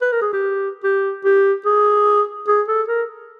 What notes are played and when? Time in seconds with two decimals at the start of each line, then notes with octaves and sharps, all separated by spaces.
0.01 B4
0.12 A#4
0.22 G#4
0.33 G4
0.84 G4
1.25 G4
1.66 G#4
2.48 G#4
2.68 A4
2.88 A#4